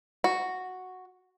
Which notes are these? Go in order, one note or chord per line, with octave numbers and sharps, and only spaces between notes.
F#4